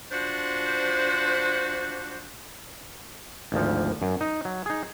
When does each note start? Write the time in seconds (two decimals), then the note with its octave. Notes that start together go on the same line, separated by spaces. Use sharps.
0.12 F3 D4 F#4 C5
3.52 G#1 D2 F3
4.02 F#2
4.21 D#4
4.45 F#3
4.66 D#4 G#4